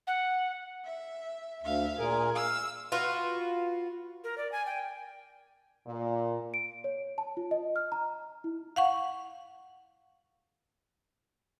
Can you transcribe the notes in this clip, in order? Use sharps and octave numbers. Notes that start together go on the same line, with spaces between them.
F#5
E5
D2 E5 F5
A#2 G#4 A#4
F5 E6
F4 F#4 B4
A#4
D5
G#5
G5
A#2
D7
C#5
A5
F4
D#5
F6
A#5
E4
F5 F#5 C#6